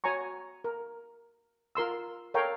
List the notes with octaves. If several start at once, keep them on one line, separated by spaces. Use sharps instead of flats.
F#4 C#5 G#5 A#5 C#6
A#4
F4 A#4 C6 E6
A4 A#4 C#5 F5 G5